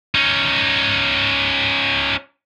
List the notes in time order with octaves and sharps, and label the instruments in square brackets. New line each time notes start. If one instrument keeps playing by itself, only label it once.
[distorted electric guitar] C#4 D#4